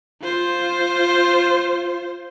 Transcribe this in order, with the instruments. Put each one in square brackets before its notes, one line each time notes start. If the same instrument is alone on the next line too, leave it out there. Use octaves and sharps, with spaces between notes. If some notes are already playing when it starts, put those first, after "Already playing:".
[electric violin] F4 C5